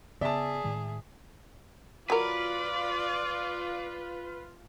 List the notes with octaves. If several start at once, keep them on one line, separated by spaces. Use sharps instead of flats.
C#3 B3 G#4 D5 E5 A5
A2 D#3 G#3
F#3 F4 A#4 B4 D5